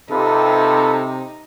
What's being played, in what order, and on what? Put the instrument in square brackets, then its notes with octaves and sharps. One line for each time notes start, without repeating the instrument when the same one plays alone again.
[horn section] C3 [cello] D#4 [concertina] F4 B4 [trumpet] A4